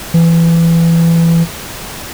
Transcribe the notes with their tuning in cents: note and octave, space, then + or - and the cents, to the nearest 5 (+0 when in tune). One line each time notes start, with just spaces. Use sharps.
E3 +20